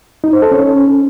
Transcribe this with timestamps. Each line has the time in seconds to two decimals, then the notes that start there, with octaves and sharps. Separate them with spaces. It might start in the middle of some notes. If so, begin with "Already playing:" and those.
0.24 D#4
0.33 C5
0.42 A4
0.52 C#4